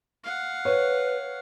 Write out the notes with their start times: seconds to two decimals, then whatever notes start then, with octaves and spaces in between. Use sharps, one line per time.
0.23 F5 F#5
0.65 B4 C#5